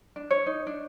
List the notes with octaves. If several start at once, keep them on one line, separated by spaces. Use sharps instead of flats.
D4
C#5
D#4
D4